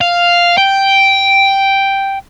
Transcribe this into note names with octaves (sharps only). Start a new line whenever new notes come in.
F5
G5